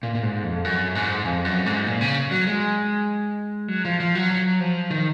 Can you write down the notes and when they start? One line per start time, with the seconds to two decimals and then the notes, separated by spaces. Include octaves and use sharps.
0.03 A#2
0.15 A#2
0.23 G#2
0.43 F2
0.65 F#2
0.95 G#2
1.25 F2
1.45 F#2
1.66 G#2
1.86 A#2
2.01 C#3
2.31 F#3
2.47 G#3
3.68 F#3
3.85 F3
4.00 F3
4.15 F#3
4.30 F#3
4.60 F3
4.90 D#3